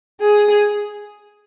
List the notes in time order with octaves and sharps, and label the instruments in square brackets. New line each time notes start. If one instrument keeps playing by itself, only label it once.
[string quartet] G#4